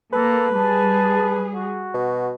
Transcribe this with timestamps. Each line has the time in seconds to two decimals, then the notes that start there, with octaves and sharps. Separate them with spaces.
0.13 A#3 A4 B4
0.55 G3 G#4 A5
1.54 F#4
1.94 B2